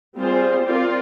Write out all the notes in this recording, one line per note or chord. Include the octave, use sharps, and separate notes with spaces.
G3 C4 F4 G#4 C5
C4 F4 A#4 D5